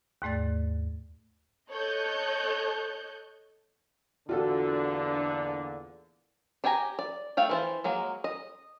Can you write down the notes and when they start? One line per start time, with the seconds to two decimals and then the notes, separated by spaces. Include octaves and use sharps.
0.22 D#2 G#2 A3 D5 A6
1.70 A4 C#5 D#5 A5 F#6 G6
4.29 E2 A#2 D3 D4 F4 F#4 A4
6.64 D4 G4 G5 G#5 A#5
6.99 D5
7.37 A3 F5 G5
7.50 E3 C5 A5
7.84 F#3 G#3 A#3
8.24 D#5